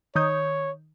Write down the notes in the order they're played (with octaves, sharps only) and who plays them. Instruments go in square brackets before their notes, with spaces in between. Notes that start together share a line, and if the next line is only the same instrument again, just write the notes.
[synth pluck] D#3 D#6 G6 [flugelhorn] C#5